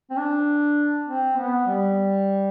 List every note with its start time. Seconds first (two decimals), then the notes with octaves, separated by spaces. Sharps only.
0.11 C4
0.18 D4
1.08 C4
1.37 B3
1.67 G3